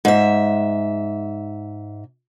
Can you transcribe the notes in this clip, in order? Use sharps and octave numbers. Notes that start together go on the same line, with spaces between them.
G#2 E5